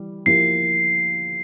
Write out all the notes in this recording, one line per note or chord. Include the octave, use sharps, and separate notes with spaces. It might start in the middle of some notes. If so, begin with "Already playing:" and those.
Already playing: E3 G3
F3 A#3 E4 G4 A#4 C7